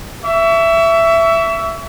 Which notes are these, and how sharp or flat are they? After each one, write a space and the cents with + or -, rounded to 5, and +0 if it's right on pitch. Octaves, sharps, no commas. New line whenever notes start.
E5 +10 C#6 +40